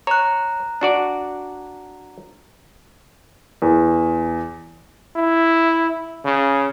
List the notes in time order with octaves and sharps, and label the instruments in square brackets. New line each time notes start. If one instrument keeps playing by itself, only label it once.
[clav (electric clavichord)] C#5 [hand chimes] A#5 F#6
[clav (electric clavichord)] D4 F#4 D5
[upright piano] E2
[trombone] E4
C#3